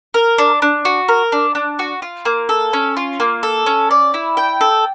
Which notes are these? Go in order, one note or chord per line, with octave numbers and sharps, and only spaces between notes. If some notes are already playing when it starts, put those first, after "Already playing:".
A#4
D4
D4
F#4
A#4
D4
D4
F#4
F4
A#3
A4
C#4
F4
A#3
A4
C#4
D5
E4
G5
A4